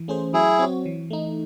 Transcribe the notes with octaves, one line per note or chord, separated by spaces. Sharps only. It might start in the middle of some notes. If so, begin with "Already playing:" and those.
Already playing: E3
A3 C#4 G#4 C5
F#3 E4 G#4
C4 F#4 C#5
E3
A3 D#4